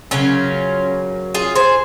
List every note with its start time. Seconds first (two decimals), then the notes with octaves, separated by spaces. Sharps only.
0.11 C#3 F#3 A#3 C#4 F4
1.34 F4 G#4
1.56 G#4 C5